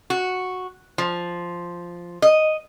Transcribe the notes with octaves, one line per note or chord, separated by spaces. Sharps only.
F#4
F3
D#5